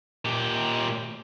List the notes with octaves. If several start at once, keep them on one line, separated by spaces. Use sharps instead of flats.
A#2 G4